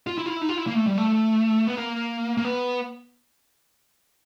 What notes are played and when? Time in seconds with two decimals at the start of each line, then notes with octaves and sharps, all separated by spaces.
0.07 F4
0.18 E4
0.26 F4
0.30 E4
0.41 D#4
0.49 F4
0.58 E4
0.67 A#3
0.75 A3
0.86 G3
0.97 A3
1.67 B3
1.77 A#3
2.37 A#3
2.45 B3